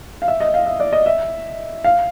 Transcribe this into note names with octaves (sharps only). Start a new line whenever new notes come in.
F5
E5
D#5
F5
E5
D5
D#5
E5
F5